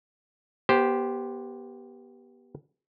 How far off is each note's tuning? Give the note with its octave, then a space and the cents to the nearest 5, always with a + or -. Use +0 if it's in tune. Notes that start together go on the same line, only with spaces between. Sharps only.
B3 -30 G4 +0 C5 +0